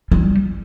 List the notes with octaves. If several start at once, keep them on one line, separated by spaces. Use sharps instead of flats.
G3